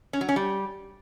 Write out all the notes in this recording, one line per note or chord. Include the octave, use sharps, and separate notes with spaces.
C#4
F#3
C#4
G3